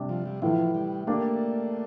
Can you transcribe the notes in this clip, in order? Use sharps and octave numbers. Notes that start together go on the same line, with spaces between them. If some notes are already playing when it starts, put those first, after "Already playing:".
Already playing: C3 G3 D4 G4
F3
G3
A2 E3 F3 A3 E4
G3
A3 A#3 D4 G4 D5